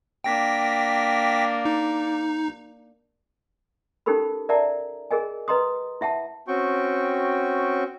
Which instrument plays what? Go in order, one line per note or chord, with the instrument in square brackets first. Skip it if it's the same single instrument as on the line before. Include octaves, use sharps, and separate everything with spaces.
[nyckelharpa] A#3 D4 [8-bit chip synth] G5 A#6 B6
[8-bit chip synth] D#4
[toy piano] C#4 D#4 G4 A4 A#4 B5
A#4 D5 E5 F#5 A5 A#5
G#4 A#4 D#5 G#5
B4 D#5 A#5 C6 D#6
E4 E5 F#5 A5
[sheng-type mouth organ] C4 C#4 F#4 G5 C#6